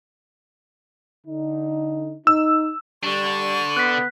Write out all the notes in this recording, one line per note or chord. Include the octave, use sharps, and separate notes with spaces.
D3 D#4
D#4 E6
D3 G3 D4 C#6
B3 F#6 B6